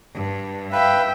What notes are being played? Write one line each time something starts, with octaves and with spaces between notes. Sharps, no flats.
G2
B4 E5 F5 G5